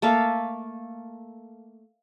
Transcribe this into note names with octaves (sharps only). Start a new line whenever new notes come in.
A3 A#3 A4 F5